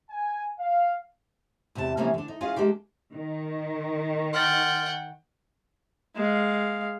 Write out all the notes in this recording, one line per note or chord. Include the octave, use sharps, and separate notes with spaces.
G#5
F5
E2 C3 D5 A5
C3 E3 F3 A#3 B3 C#4
D3 D4
D#4
C#4 F4 G#4 D#5 F5 F#5
G#3 A#3 D4 G4
D#3
F#5 G5 C6 F6 A6
G#3 F5